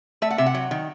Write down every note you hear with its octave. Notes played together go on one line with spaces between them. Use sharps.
A3 E5
F#5
C3 E5
F#5
F#3
D#3